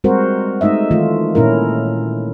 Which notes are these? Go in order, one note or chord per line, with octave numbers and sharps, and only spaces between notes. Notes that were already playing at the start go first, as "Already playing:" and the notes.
G3 G#3 C4 F#4 A#4 C5
G#3 A3 D#4 D#5 E5
D#3 E3 A3 F4
A#2 C#4 E4 A#4